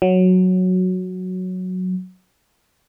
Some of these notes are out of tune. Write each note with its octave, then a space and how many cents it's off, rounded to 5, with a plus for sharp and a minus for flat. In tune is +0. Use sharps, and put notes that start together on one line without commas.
F#3 -5